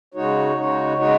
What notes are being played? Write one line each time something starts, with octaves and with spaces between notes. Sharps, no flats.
C#3 G#3 D#4 F#4 C#5
C#3 G#3 D#4 F#4 C#5
C#3 G#3 D#4 F#4 C#5